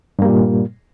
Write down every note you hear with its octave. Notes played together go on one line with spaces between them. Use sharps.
G2 A#2 G3 A#3